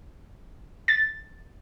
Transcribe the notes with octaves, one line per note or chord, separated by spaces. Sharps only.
A6